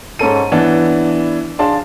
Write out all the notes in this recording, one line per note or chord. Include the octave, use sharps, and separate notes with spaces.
G#2 C#4 A4 D#7
E3 B3 D4
D4 G#4 F5 A5 C6